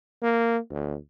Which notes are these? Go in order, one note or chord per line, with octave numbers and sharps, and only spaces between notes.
A#3
D2